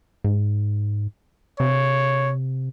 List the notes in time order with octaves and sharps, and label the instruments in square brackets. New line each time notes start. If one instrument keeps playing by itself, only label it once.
[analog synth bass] G#2
[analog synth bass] C3 [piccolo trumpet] C#5